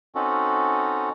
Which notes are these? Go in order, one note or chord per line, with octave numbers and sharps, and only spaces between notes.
C4 C#4 D#4 F#4 A4